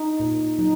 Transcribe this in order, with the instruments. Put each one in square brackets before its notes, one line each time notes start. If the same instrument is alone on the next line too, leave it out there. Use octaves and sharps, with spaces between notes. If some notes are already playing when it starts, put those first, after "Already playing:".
Already playing: [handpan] D#4
A#2
F#3 D#4